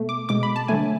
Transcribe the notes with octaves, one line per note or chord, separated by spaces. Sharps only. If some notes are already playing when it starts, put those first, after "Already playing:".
Already playing: B2 A3
D6
B2 G#3 D6
B5
A5
D3 F#3 A3 G#5